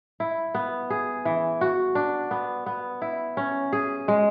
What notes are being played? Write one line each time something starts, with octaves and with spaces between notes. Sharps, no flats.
E4
B3
G#4
E3
F#4
D4
B3
B3
E4
C#4
G#4
G#3